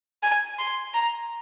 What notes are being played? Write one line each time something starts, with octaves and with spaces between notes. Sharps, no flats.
G#5
C6
A#5